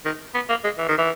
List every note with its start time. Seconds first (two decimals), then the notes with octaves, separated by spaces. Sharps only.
0.05 D#3
0.34 B3
0.49 A#3
0.64 G#3
0.78 E3
0.88 D#3
0.98 E3